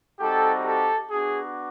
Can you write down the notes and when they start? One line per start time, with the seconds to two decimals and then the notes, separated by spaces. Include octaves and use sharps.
0.19 G3 C4 D#4 F#4 G4 A4
0.64 G4 A4
1.08 B3 D4 F#4 G#4